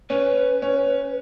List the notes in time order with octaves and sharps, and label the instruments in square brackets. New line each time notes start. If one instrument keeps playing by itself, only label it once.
[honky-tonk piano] C#4 [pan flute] B4
[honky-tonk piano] C#4